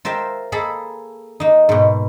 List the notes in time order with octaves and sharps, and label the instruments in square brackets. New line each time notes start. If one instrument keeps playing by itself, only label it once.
[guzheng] F4 A#4 C5 E5 G5
A#3 G#4 A4 B5
A#3 D#4
G#2 B2